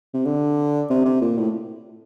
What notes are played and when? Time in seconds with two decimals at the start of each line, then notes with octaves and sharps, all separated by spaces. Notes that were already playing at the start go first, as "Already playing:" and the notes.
0.14 C3
0.25 D3
0.90 C3
1.05 C3
1.21 A#2
1.37 A2